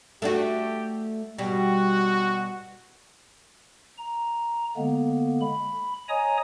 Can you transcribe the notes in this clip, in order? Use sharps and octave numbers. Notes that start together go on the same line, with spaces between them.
A3 D4 F#4 G4
B2 G3 F#4
A#5
D3 G#3 A#3 B3
B5
C#5 D#5 G#5 A#5 D#6